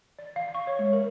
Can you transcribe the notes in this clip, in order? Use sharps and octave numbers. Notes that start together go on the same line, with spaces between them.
D5
F5
C#6
C#5
G#3
A#4